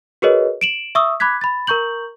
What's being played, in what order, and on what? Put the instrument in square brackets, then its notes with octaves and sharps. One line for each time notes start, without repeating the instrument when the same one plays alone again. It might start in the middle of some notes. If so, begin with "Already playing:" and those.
[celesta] F#4 G#4 A#4 B4 C#5 D#5
D7 E7 F#7
E5 C#6 D#6 E6
B5 D6 F#6 G#6 B6
B5 A6
A#4 A#5 C#6 G6 F#7